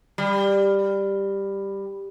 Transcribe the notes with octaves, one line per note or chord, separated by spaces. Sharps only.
G3